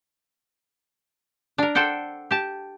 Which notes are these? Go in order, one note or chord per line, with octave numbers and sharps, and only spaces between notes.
D4 A#4
A4 C5 D5 F#5 G5
G4 A5